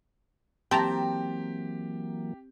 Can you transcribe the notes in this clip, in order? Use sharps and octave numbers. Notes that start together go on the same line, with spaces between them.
E3 F#3 A#3 C4 G4 G5 A5 A#5